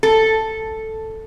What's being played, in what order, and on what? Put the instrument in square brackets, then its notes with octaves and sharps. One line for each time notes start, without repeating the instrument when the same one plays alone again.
[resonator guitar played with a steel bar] A4